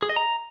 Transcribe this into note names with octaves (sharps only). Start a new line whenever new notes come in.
G#4
D#5
A#5